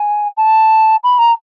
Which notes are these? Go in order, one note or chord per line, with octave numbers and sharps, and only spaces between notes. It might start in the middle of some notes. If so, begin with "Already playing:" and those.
Already playing: G#5
A5
B5
A#5